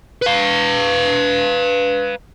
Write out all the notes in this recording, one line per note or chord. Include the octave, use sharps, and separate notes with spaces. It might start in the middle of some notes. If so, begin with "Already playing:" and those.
B4 F5